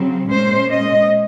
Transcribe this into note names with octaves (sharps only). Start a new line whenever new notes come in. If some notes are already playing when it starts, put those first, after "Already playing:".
Already playing: C#3 F#3 C4
A#2 G#3 C#4 C5
D#5